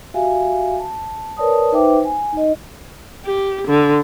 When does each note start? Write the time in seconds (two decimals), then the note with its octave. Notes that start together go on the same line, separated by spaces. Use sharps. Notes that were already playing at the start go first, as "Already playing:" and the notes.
0.14 F#4 G4 E5 F5 G#5
0.80 A5
1.37 A#4 B4 C#5 D5 A5 D#6
1.72 D#4 B4 C5 E5 G5 D6
2.04 G#5
2.33 D#4 D#5
3.25 G4
3.67 D3